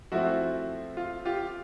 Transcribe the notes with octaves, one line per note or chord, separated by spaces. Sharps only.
F3 A3 C4 E4 F#4
F4
F4 G4